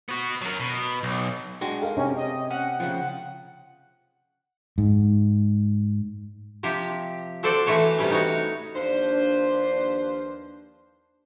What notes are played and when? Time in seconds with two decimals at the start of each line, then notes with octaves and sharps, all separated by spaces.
0.09 B3 F#4
0.41 F#3 A#4
0.60 B2
1.03 B1
1.61 G#3 D4 F#4 G5
1.82 A#4 F5
1.97 C3 C#4
2.17 D#5
2.51 C#4 F#5
2.80 C#3 F3
4.78 G#2
6.63 C3 F3 G4
7.43 F#4 A4 C5 D5
7.66 E3 A3 F#4 C#5 A5
7.98 C3 G3 C#4
8.10 D#4 F#4 C#5
8.75 D#2 F3 D4 B4 C5